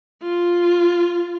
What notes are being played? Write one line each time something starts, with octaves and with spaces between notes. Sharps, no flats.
F4